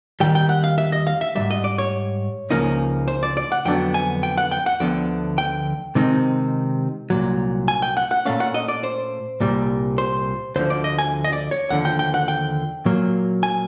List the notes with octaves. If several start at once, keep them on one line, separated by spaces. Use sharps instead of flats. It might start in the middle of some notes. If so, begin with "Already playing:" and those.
D#2 D#3 G3 G5
G5
F#5
F5
E5
D#5
F5
E5
G#2 D#3 G3 E5
D#5
D5
C#5
C#2 C#3 F3 A#3 D#4
C5
D5
D5
F#5
F2 D3 F#3 B3 D4 G5
G#5
G5
F#5
G5
F#5
D2 D3 F3 B3 G5
G5
C3 D#3 G#3 C4 D#4
C2 A#2 F#3
G#5
G5
F#5
F#5
A#2 F#3 A3 C#4 F5
F#5
D#5
D5
C5
C2 A#2 G3
C5
D2 D3 F3 C5
D5
D#5
G#5
D#5
D5
C#5
D#2 D3 F3 F#5
G5
G5
F#5
G5
A#2 F#3 A#3
G#5